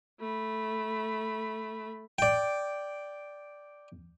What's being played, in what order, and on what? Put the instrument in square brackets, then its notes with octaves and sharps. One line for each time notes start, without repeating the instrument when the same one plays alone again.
[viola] A3 B5
[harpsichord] D5 G5